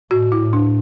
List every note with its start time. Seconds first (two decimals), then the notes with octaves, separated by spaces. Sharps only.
0.11 A2 F#4
0.32 E4
0.39 A2
0.53 D4